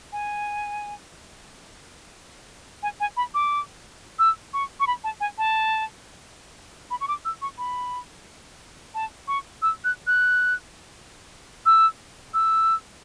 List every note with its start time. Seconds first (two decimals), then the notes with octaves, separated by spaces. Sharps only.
0.12 G#5
2.83 G#5
3.00 G#5
3.17 B5
3.34 D6
4.19 E6
4.53 C#6
4.80 C#6
4.87 B5
5.04 A5
5.20 G#5
5.38 A5
6.91 B5
7.01 C#6
7.08 D6
7.25 E6
7.42 C#6
7.58 B5
8.95 A5
9.28 C#6
9.62 E6
9.84 F#6
10.07 F#6
11.66 E6
12.34 E6